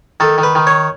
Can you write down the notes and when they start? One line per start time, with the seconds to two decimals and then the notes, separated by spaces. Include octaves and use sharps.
0.20 D#3 A4
0.38 D#3
0.43 B4
0.55 D#3
0.67 C#5